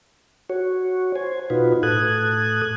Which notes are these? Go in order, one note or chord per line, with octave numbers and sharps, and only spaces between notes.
F#4 C#5
C5 G#5
B2 D#4 F4 F#4 B4
A2 A4 D#6 F#6 G#6